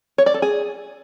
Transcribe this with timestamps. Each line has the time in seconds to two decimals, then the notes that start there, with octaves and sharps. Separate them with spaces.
0.18 C#5
0.26 D5
0.34 A4
0.42 G#4